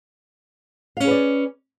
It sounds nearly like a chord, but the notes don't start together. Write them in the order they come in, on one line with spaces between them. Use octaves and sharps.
F5 C#4 G#4 B4 D5